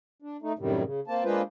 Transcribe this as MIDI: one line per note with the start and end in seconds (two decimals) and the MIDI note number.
0.22 0.37 62
0.42 0.52 57
0.42 0.52 63
0.59 0.83 42
0.59 0.83 45
0.59 0.83 48
0.59 0.83 51
0.59 0.83 55
0.84 1.00 49
1.07 1.24 58
1.07 1.24 60
1.07 1.24 81
1.24 1.42 56
1.24 1.42 58
1.24 1.42 62
1.24 1.42 65
1.24 1.42 71
1.24 1.42 72